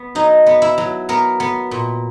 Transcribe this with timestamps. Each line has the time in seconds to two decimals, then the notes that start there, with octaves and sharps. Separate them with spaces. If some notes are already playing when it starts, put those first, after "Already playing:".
Already playing: B3
0.15 F#3 D#4
0.46 B3
0.62 E4
0.78 F#3
1.09 B3 A#4
1.40 B3
1.71 A#2